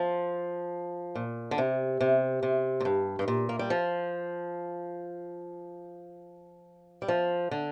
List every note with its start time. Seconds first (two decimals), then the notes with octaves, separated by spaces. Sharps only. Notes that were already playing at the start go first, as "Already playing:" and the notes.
Already playing: F3
1.15 A#2
1.51 D3
1.58 C3
2.00 C3
2.43 C3
2.80 A#2
2.85 G2
3.19 G2
3.28 A#2
3.49 A#3
3.59 G3
3.70 F3
7.02 G3
7.08 F3
7.51 D3